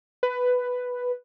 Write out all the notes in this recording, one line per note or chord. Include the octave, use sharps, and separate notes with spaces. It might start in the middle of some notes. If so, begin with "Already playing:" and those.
B4